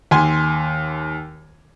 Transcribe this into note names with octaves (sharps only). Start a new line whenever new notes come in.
D#2 G#5 C6